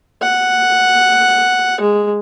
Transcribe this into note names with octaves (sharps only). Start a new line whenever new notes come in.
F#5
G#3